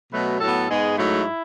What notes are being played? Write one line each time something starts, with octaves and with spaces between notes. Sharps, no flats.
B2 F#3 A3 B4
A2 F#3 B3 A4
G#2 G#3 B3 G#4
G#2 F#3 A3 E4